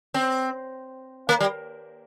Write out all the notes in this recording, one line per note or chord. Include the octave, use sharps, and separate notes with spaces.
C4
A#3
G3